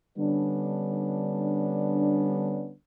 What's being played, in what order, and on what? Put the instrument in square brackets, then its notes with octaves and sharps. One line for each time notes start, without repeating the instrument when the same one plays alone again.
[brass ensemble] D3 G3 B3 C#4 D4